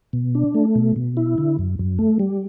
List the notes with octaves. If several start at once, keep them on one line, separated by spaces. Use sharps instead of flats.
B2
D4
A3
B2
B2
E4
D3
F#2
F#2
A3
G3